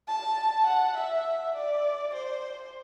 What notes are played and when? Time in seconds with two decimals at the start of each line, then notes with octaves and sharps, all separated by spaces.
0.08 A5
0.67 F#5
0.97 E5
1.56 D5
2.15 C5